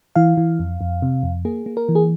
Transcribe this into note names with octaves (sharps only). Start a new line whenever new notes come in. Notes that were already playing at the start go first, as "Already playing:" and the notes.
E3 F5
E3
F2
F2
C3
F2
A#3 G#4
A#3
A#4
E3
G#4